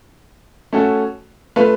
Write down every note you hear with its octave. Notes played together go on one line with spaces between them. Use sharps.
A3 C#4 F#4 A4
A3 F4 B4